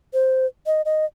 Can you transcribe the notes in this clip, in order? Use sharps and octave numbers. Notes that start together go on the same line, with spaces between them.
C5
D#5
D#5